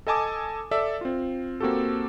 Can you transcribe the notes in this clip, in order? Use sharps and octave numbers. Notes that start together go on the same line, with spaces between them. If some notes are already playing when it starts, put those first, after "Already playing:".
A4 D#5 G#5 A5 D6 D#6
A4 D5 E5
C4 F4
A#3 C4 F#4 G4 A4